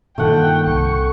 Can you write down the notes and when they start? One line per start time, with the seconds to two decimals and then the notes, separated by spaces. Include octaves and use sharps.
0.18 G2 A#2 D#3 A3 F#5 G5
0.66 C2 C#6